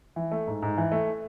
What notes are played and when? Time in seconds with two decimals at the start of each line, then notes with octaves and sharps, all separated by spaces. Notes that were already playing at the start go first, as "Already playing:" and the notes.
0.16 E3
0.31 A3
0.47 G#2
0.62 G#2
0.78 E3
0.92 A3